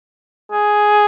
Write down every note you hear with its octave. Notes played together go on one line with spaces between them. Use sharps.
G#4